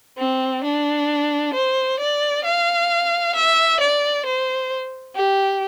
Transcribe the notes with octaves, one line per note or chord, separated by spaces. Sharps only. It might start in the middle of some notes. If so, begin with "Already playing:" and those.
C4
D4
C5
D5
F5
E5
D5
C5
G4